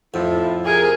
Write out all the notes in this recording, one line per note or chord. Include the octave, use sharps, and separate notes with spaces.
F2 A2 F3 E4
C3 G#4 A#4 G#5